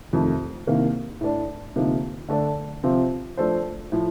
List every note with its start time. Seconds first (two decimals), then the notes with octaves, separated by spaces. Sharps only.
0.13 F2 C3 D#3 A3
0.67 C2 C3 D#3 A#3
1.21 A2 A3 D4
1.76 D2 C3 F3 A#3 D#4
2.29 D3 A3 D4
2.83 C3 F3 C4 F4
3.37 F3 A3 D4 A4 C5
3.92 A2 F3